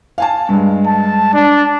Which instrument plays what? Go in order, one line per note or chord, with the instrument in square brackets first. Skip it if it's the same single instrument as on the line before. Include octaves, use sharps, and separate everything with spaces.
[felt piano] F5 G#5 A5
G2 G#3
[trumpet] A5
D4